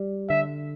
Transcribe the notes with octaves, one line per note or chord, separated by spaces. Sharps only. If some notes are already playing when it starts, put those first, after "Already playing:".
Already playing: G3
D3 E5